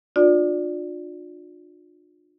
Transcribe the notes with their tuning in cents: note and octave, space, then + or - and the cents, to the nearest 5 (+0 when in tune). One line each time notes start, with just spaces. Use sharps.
D4 +40 F4 +35 D5 +0